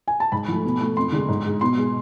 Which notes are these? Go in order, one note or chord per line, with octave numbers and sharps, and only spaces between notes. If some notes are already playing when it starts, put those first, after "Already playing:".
G#5
A5
G#2 B5
F3 A3
B2
A3
F2 C6
D3 G#3
G#2
G#3
B2 C6
G#3